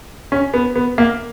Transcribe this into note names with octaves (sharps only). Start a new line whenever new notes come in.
C#4
B3
B3
A#3